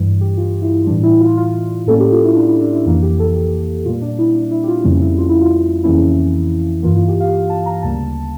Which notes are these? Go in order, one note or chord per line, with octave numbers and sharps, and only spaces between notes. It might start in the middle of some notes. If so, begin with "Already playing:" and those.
Already playing: G2 E3 G3
G4
F4
E4
A2 E3 G3 D4
E4
F4
F4
A2 G3 A#3 C#4 A4
G4
F4
E4
D4
E4
D4
E4
F2 E3 A#3 E4
G4
A4
G4
A#2 G3 A#3 F4
D4
E4
D4
E4
G4
F4
F2 C#3 G3 A#3 C#4 E4
E4
F4
E4
F4
F2 C#3 E3 A#3 C#4 E4
G2 E3 A#3 F4
F4
G4
F5
A5
A#5
D2 C#3 G3 A#3 A5